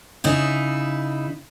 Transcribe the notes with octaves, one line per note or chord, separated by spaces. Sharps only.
C#3 D#4 E4